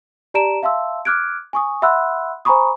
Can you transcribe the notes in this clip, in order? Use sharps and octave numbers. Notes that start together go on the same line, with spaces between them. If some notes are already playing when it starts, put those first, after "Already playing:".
G4 D5 A5 A#5 D7 E7
E5 F5 A5 C6 E6
D6 F6 F#6 G#6 D7
G#5 C#6 D#6
E5 F#5 B5 C6 E6 F#6
C5 G#5 A#5 B5 C#6 D#6